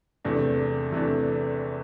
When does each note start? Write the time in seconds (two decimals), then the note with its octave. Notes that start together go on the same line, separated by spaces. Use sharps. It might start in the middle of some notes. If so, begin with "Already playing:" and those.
0.25 E2 C3 E3 A3 D4
0.92 C3 E3 A3 D4